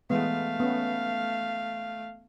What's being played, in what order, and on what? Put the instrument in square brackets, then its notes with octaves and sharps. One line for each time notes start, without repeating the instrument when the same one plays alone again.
[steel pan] E3 G#3 B3 [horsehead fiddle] A3 F5
[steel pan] B3 C#4